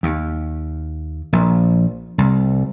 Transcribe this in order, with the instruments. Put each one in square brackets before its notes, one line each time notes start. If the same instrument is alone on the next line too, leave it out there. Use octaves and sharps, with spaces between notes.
[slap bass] D#2
A#1
C2